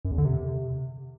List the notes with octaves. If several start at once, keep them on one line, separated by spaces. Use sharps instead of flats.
F#2
E2
D3
C3